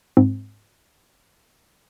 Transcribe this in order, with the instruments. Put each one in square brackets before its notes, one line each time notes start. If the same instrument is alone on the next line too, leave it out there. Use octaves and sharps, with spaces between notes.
[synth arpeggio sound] G#2 C4